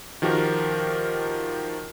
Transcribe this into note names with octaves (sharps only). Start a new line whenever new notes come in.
D#3 F3 F#4 G4 A#4